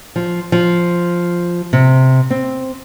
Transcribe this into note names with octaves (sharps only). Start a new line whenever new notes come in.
F3
F3
C3
C4